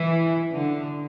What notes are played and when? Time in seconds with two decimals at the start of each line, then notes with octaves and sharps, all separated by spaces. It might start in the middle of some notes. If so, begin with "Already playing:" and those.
Already playing: E3
0.55 D3